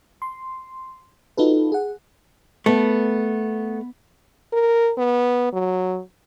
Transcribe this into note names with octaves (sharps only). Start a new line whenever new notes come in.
C6
D#4 F4 F#4 A4 B4
G#4 F#5
A3 B3
A#4
B3
F#3